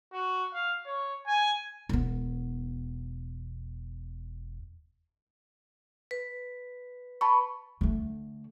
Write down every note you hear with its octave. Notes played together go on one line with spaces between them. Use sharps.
F#4
F5
C#5
G#5
E1 B3
B4
A5 B5 C#6
D3 A3